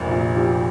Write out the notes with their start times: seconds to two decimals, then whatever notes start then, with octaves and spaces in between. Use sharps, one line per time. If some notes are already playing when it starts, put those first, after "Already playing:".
Already playing: F1 A#1
0.11 A#2
0.36 F3 G4